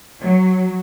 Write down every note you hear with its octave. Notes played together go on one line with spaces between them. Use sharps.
F#3